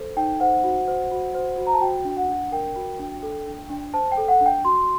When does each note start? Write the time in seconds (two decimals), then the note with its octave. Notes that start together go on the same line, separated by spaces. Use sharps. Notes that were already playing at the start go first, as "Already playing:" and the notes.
Already playing: A4 C5
0.17 D#4 G5
0.40 C5 F#5
0.64 F#4
0.88 C5
1.11 F#4
1.34 C5
1.58 F#4
1.67 A#5
1.74 A5
1.81 F#4 G5
2.05 D4
2.17 F#5
2.28 D4
2.52 A#4 G5
2.76 F#4
2.99 D4
3.23 A4
3.47 D4
3.70 D4
3.94 C5 A5
4.12 G5
4.17 A4
4.28 F#5
4.41 D4
4.46 G5
4.65 F#4 C6